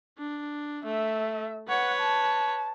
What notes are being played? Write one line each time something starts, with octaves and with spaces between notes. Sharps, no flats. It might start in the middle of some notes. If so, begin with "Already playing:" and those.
D4
A3 E5
B4 C#5 F#5
A5